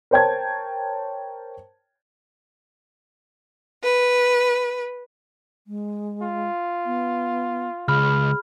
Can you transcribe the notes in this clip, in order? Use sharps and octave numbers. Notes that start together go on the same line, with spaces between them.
A#4 C5 C#5 G5 A5 G#6
B4
G#3
F4
B3
C#2 G#4 B5 F6